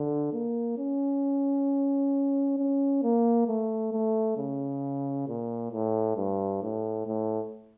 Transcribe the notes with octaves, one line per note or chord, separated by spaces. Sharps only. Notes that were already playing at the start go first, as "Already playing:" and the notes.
Already playing: D3
A#3
C#4
C#4
A#3
A3
A3
C#3
A#2
A2
G2
A2
A2